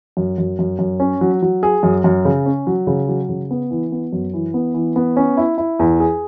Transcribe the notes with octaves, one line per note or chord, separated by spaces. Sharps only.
F#2
F#2
F#2
F#2
C#4
F#3
F#3
G#4
F#2
F#2
C#3
C#4
F#3
C#3
F#3
C#3
B3
E3
B3
F#2
E3
B3
E3
B3
C#4
E4
E4
E2
G#4